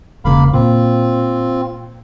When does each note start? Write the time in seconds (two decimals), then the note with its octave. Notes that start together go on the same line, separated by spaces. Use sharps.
0.25 E1 C#3 A#3 F5 B5
0.53 A#2 C4 F4